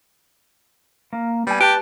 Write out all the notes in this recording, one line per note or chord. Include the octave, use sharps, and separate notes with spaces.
A#3
G3 B3 G#5
G4 B4 A5